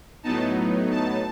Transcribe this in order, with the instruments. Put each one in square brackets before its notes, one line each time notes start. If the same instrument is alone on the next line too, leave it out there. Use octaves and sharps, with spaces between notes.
[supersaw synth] A2 F#3 B3 D#4 A5
A5